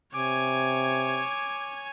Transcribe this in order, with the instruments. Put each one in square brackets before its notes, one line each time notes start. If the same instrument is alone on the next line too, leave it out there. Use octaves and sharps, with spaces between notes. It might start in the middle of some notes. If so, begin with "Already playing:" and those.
[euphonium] C3 [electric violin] C#5 G#5 [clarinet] D6